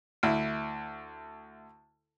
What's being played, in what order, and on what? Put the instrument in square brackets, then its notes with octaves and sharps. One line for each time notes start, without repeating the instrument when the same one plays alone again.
[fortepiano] D2 E4